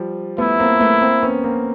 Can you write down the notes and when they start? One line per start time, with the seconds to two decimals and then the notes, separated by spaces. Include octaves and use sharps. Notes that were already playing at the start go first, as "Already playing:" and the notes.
Already playing: F3 G3
0.38 A3 B3 E4
0.60 A#3 C4
0.81 A3 B3
1.01 A#3 C4
1.23 B3 C#4
1.44 A#3 C4